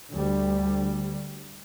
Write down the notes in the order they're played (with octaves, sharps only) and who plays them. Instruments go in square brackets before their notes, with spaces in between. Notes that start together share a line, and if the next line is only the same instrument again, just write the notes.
[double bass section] D2 G3